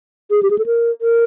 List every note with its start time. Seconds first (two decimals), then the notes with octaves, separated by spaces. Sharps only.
0.31 G#4
0.43 G4
0.50 G#4
0.58 A4
0.66 A#4
1.01 A#4